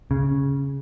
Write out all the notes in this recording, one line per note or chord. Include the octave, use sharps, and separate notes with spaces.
C#3